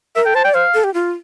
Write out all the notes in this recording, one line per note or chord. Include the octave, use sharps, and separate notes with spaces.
A#4 E5
A4 G5
C5 A5
D5 G5
C5 F5
A4
G4
F4